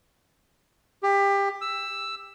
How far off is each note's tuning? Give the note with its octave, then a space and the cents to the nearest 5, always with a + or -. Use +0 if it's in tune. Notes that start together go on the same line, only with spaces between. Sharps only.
G4 +25
E6 +5